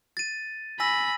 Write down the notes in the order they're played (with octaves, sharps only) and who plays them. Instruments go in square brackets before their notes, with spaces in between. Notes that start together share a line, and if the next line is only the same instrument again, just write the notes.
[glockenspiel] A6 D#7
[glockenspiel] G#5 E6 A#6 [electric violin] B5